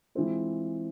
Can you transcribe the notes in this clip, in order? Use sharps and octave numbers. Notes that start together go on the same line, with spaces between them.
E3 G#3 C4 F4